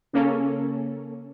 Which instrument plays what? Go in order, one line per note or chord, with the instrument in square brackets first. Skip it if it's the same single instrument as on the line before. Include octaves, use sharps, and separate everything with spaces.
[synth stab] C#3 A#3 C#4 A4